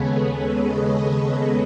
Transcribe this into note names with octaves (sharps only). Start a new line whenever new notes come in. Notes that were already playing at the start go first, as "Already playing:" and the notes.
Already playing: D#2 C#3 G#3 B3 G#4 A4 B4 C#5
B4 D#5
A4 C#5